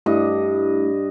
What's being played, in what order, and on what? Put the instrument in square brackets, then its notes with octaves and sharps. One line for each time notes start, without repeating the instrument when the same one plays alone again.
[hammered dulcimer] G2 D#5 [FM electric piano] A3 D4 E4